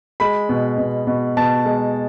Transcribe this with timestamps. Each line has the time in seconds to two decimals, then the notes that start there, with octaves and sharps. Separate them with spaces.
0.20 G#3 B5
0.49 B2
0.78 B2
1.07 B2
1.37 B2 A5
1.66 G#3